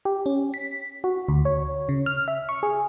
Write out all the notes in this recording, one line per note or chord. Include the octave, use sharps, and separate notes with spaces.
G4
C#4
B6
F#4
D2
C#5
C#3
F6
E5
C#6
G#4